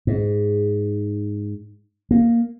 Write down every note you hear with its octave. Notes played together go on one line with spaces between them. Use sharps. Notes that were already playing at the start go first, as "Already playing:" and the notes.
G#2
A#3